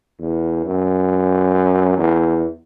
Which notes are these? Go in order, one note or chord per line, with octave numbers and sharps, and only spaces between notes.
E2
F#2
E2